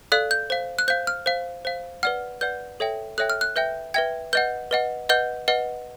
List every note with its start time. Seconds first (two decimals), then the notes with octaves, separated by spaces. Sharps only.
0.12 A4 D5 F5 F#6
0.31 G6
0.50 C5 F5
0.79 F#6
0.88 C5 F5 G6
1.07 F6
1.26 C5 F5
1.65 C5 F5
2.03 B4 D5 F#5 F6
2.41 B4 D5 F#5 G6
2.80 A4 C#5 E5 G5
3.18 A4 C#5 E5 G5 F#6
3.30 F6
3.41 F#6
3.56 B4 E5 G5 G6
3.94 B4 E5 G5 G#6
4.33 B4 D#5 F#5 G6
4.71 B4 D#5 F#5
5.09 B4 D#5 F#5 G6
5.48 B4 D#5 F#5